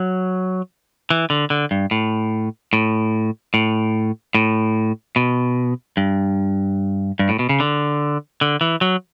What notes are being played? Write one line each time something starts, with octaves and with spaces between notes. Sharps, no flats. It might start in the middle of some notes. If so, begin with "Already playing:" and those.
Already playing: F#3
E3
D3
D3
G2
A2
A2
A2
A2
B2
G2
G2
A2
B2
C#3
D3
D3
E3
F#3